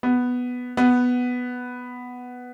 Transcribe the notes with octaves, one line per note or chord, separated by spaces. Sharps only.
B3
B3